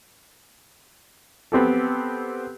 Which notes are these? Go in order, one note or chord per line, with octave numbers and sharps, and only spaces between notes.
B3 C4 G4 A4